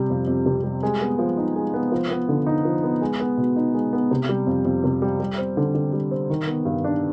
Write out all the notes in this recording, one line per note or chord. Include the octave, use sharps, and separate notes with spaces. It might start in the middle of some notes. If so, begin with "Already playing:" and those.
Already playing: C3 G3
F2
F2
C3
G3
G#3
B3
F3
D#4
G#3
B3
F3
B3
D3
D#4
F3
B3
G#3
B3
B2
D#4
G#3
B3
C3
G3
F2
F2
C3
G3
G3
C4
D3
D3
G3
C4
D#3
B3
G2
D4